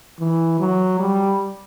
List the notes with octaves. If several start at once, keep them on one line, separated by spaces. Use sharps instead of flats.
E3
F#3
G3